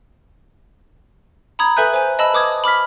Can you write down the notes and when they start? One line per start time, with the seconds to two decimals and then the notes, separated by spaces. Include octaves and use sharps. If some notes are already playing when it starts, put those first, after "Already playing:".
1.59 A#5 B5 D#6 G#6
1.77 A4 B4 E5 G#5 F#6 G6
1.94 C5 G#5
2.19 D#5 A5 B5 E6
2.34 B4 D6 D#6 G#6
2.64 B5 D6 F6 B6